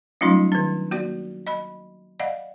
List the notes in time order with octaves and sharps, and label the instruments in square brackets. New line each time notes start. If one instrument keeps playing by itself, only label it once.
[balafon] F#3 G3 A3 C#4 D#4 F4
D#3 D4
A#3 F#4 D5
D#5 B5
D5 D#5 F5 F#5